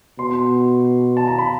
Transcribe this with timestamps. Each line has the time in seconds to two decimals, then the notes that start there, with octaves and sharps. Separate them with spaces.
0.19 B2 C6
1.17 A5
1.28 A#5
1.38 B5